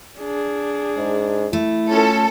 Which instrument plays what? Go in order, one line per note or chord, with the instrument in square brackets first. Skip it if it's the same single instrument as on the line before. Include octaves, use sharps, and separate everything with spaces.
[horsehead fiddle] D4 G#4
[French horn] G#2
[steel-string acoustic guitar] A3 [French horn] E4
[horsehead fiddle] C#4 F4 [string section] A4